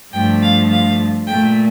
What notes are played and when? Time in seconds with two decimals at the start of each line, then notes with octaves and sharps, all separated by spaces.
0.12 G2 F3 A3 G5
0.42 F5
0.70 F5
1.27 A#2 A3 G5